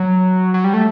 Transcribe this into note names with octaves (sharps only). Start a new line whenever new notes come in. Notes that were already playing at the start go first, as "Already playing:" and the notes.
Already playing: F#3
F#3
G3
A3